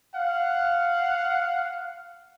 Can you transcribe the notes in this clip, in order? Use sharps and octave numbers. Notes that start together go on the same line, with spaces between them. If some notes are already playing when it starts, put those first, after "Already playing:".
F5 F#5